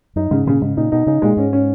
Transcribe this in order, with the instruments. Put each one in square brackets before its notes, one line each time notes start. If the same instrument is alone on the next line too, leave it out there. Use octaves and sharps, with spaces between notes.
[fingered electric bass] F#2 [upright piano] D#4
[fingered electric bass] G#2 [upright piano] C#3
[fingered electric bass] A#2 [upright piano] C#3
[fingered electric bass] G#2 [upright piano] C#3
[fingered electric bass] A#2 [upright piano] D#4
[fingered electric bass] B2 [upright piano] D#4
[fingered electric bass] C#3 [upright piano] D#4
[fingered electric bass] A#2 [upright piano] G#3
[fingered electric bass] G#2 [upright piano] C#4
[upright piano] C#4